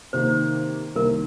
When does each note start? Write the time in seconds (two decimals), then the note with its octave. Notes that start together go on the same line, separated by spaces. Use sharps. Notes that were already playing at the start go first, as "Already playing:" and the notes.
0.13 C3 D#3 A#3 C5
0.95 C2 C3 D#3 A#3 A#4